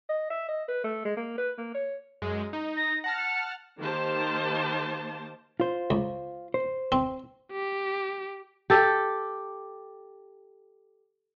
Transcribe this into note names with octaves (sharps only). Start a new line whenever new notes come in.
D#5
E5
D#5
B4
A3
G#3
A#3
B4
A#3
C#5
F#2 G#3
D#4
A#6
F#5 A5 F6 A#6
C#7
D#3 A#3 G4 C5 A5
F4 C5
C#2
C5
C4
G4
G4 A4